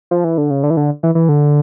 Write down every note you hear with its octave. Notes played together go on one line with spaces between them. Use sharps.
F3
E3
D3
C#3
D3
E3
D3
E3
E3
D3